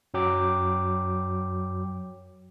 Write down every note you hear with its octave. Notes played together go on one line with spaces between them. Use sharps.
F#2 F#3 G5 D6